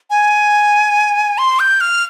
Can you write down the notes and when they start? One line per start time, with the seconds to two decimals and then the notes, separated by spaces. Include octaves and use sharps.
0.10 G#5
1.38 C6
1.60 G6
1.81 F6